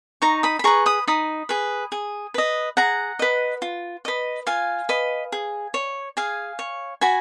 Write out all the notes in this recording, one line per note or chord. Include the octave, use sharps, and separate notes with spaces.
D#4 A#5 C#6
B5 D#6
B5
G#4 B4 A#5 C#6
B5 D#6
D#4 B5 D#6
G#4 B4
G#4
B4 D#5
G#4 F#5 A#5
B4 D#5
F4
B4 D#5
F4 F5 G#5
B4 D#5
G#4
C#5
G#4 F5 G#5
C#5
F#4 G#5 B5